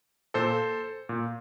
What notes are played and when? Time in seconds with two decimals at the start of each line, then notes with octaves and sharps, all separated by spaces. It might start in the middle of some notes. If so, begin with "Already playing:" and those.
0.34 A#2 A4 C5
1.09 A#2